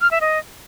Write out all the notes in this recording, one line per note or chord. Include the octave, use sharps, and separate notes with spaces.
F6
E5
D#5